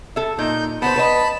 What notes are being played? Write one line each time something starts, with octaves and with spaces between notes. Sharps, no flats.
A4 E5
A#2 D#4 G6
B3 B4 C5 A5 B5
B4 C5 D#5